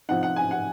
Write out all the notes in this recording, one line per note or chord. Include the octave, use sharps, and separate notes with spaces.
C3 F3 C4 D#4 F#5
F#5
G#5
F#5